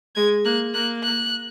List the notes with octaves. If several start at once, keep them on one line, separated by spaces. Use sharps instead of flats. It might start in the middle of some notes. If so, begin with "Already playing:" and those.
G#3 G#6
A#3 F#6
A#3 F#6
F#6